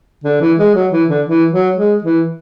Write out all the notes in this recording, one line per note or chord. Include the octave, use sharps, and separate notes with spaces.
D3
E3
G#3
F#3
E3
D3
E3
F#3
G#3
E3